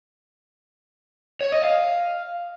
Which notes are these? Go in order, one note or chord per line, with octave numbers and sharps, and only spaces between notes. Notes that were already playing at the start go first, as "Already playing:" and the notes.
C#5
D#5
F5